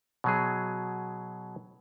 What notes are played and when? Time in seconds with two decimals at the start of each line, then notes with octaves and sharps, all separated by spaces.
0.24 B2 F#3 G#4